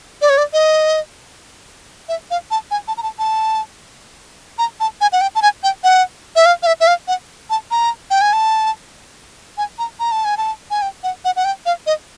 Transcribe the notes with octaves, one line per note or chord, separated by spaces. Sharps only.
D5
C#5
D5
D#5
E5
F5
A5
G#5
A5
A#5
A5
A5
A#5
A5
G#5
F#5
G5
A5
G#5
G5
F#5
E5
F5
F5
E5
E5
F5
F#5
A5
A#5
G5
G#5
A5
G#5
A#5
A#5
A5
G#5
A5
G#5
G5
F#5
F#5
F#5
G5
F5
D#5